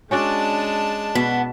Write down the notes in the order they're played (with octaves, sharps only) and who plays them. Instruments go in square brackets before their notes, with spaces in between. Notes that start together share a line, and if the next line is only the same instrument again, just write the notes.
[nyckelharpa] G#3 [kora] C#4 F#4 D5 [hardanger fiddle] D4 A5
[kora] B2 [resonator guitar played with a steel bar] B3